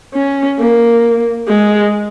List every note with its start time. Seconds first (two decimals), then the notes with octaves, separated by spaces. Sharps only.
0.14 C#4
0.59 A#3
1.48 G#3